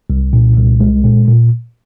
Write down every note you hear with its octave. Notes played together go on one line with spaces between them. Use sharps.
C2
A#2
C2
G#3
A#2
A#2